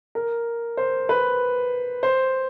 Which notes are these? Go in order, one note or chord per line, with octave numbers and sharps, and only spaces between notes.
A#4
C5
B4
C5